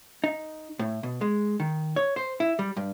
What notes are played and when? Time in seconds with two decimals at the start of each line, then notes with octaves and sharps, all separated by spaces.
0.24 D#4
0.79 A2
1.03 B2
1.21 G#3
1.60 D#3
1.96 C#5
2.16 C5
2.40 E4
2.59 G3
2.77 G2